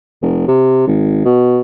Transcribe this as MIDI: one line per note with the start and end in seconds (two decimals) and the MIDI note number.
0.22 0.45 29
0.48 0.86 48
0.87 1.23 32
1.25 1.61 47